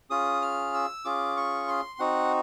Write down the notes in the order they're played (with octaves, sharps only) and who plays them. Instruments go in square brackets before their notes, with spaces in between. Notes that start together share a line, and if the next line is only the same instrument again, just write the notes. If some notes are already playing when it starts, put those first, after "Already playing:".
[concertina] C#4 F4 G#4 D#6
F6
E6
C#4 F4 G#4 D6
C#6
C6
C4 D#4 F#4 F#5